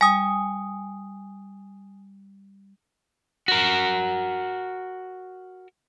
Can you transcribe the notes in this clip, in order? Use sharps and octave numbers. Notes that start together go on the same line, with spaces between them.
G3 G#5 D#6
F#4 A#4